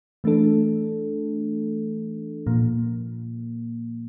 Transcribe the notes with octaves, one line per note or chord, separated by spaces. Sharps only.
E3 A3 D4 A4
A#2 F3 A#3